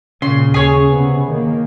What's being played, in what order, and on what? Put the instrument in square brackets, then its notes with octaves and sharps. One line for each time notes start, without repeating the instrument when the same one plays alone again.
[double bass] A#2 [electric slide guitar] C#3 [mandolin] C6
[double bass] D#2 [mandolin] G#4 C#5
[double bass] C3 B3
D#3 A#3